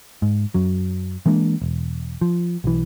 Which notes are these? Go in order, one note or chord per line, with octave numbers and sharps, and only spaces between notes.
G#2
F#2 F#3
E3 G#3 A#3 D4
E1
F3
B1 E3